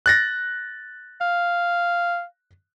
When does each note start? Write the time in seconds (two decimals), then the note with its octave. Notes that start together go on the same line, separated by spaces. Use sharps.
0.06 F#6 A6 A#6
1.21 F5